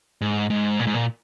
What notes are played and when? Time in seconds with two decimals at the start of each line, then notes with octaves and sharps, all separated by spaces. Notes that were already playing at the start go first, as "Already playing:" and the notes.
0.21 G#2
0.50 G#2
0.79 A#2
0.87 G#2
0.94 A#2